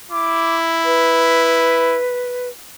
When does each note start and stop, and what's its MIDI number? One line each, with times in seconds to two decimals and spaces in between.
0.11 1.99 64
0.11 0.57 86
0.85 2.48 71